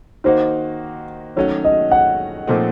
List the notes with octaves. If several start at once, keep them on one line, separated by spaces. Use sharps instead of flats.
D#3 A#3 D#4 F#4 C5
D#3 F#3 A3 C#4 F#4 C#5
D#5
F#5
A#2 F3 A3 C4 D#4